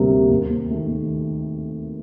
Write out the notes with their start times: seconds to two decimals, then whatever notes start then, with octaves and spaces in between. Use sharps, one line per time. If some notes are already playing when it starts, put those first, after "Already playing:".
Already playing: D2 C3 G3 A#3
0.30 D#2
0.70 D#3 A3